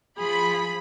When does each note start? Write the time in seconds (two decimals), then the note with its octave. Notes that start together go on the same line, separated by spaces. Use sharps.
0.18 F3 G#4 B5